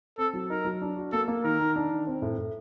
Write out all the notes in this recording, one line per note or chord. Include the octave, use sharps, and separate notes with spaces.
C4 A4
F#3
D#4 A#4
F#3
D4
F#4
A#3 A4
A#3
D#3 A#4
D#3
D4
D#3
C4
A2
A2